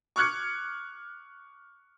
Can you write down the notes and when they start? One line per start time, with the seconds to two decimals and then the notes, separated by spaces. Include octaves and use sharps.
0.16 C#6 D6 F6 F#6 G#6 C#7